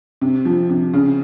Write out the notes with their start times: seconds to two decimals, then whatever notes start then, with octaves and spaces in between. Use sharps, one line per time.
0.21 C3
0.45 F3
0.70 C3
0.93 C#3